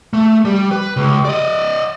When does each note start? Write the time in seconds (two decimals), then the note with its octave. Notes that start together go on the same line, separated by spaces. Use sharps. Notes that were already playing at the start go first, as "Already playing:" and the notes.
0.13 A3
0.45 G3
0.71 B4
0.97 C#2
1.25 D5 D#5